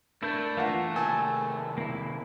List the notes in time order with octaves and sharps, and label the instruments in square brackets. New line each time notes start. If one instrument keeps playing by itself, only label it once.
[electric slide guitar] A3 [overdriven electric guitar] D4 [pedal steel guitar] E4 A#4 G6
[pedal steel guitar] E3 A#3 F4 [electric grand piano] F5 F#5
[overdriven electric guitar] C3 D#3 [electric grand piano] G#5 A5 [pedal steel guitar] E6
[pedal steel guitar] A#3 E4